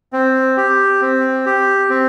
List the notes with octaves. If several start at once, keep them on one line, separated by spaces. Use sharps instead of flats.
C4
G4
C4
G4
C4